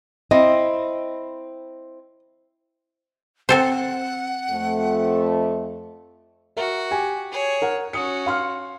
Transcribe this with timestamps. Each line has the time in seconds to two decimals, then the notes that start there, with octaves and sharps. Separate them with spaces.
0.31 C4 E4 D#5
3.49 C4 A4 C5 F#5
4.51 F2 A3
6.57 F#4 A#4 E5
6.91 G4 G#5
7.31 G#4 C#5
7.62 A#4 F#5
7.93 C#4 F#4 D#6 C#7
8.26 F5 C6 F6